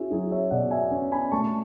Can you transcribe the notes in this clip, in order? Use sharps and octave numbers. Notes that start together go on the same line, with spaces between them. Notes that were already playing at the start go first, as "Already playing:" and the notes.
Already playing: C#4 E4 F#4 G#4
F#3 E4 G#4
C#5 E5
B2 D5 F#5
E5 G#5
C#4
G#5 B5
A3 A5 C#6